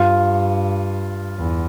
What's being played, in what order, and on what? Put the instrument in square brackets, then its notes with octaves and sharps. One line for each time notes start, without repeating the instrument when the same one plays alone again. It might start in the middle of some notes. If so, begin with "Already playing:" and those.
Already playing: [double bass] G2 [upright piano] F4
[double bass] E2